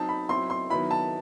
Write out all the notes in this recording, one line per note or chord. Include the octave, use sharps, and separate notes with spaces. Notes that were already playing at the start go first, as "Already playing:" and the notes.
Already playing: F#3 C4 D#4 A5
B5
F#3 C4 E4 C6
C6
D#3 F#3 B3 E4 B5
A5